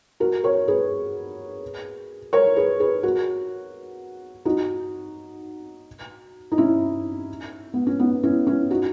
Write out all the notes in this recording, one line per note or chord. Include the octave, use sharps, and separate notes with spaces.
F#4 A#4
A#4 C#5
G#4 B4
A#4 C#5
G#4 B4
G#4 B4
F#4 A#4
D#4 F#4
D#4
C#4 E4
B3
C#4
B3 D#4
C#4 E4
C#4 E4
D#4 F#4